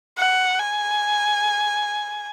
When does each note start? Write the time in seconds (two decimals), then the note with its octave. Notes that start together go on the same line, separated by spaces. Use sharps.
0.18 F#5
0.59 G#5